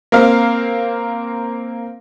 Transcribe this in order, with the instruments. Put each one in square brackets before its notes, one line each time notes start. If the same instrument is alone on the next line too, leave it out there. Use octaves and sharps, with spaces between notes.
[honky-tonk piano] A#3 C4 F5